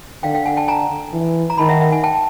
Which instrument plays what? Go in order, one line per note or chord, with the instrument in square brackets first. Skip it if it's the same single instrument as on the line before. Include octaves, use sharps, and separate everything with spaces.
[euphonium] D3 [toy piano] F5 G5
[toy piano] F5 G5
F#5 G#5
G5 A5
G#5 A#5
[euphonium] E3
[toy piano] A#5
[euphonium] D#3 [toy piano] A5 B5
[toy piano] E5 F#5
E5 F#5
F#5 G#5
G5 A5